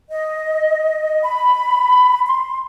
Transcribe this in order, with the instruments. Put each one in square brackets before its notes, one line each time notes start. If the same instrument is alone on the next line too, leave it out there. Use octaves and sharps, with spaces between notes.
[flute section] D#5
B5
C6